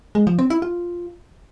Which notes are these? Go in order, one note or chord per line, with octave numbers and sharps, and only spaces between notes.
G#3
F3
C4
E4
F4